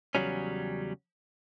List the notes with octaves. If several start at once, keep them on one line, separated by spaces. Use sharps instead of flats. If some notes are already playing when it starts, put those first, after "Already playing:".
E2 C#3 F#3 G3 C#4